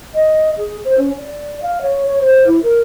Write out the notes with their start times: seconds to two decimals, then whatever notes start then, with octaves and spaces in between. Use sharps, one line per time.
0.14 D#5
0.57 G#4
0.84 C5
0.97 C#4
1.17 D5
1.62 F5
1.81 C#5
2.06 C#5
2.20 C5
2.46 E4
2.62 A#4